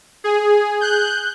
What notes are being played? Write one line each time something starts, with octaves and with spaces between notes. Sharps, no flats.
G#4
F#6 G6